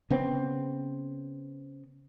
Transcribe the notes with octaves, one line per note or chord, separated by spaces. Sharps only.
C#3 B3 C4